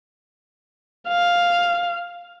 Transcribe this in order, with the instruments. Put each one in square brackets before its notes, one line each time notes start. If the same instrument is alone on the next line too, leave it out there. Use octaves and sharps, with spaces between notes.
[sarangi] F5